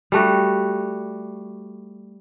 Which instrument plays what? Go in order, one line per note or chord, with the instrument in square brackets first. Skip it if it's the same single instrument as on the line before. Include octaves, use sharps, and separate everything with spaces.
[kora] G3 A3 F#4